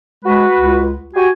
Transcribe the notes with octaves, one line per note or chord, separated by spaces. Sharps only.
G#3 F#4 B4
C#2
F#4 G4 G#5